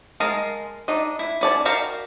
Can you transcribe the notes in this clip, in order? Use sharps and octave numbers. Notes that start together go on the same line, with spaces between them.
G#3 A#4 D#5 F5 A5
D4 D#4 D#5
E4
C#4 D5 A5
F#4 G4 A#4 F5 A5